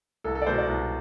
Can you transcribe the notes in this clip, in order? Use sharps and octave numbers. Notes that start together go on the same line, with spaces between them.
C2 A4
A4
D5
B2 G#3 C5
D5
C2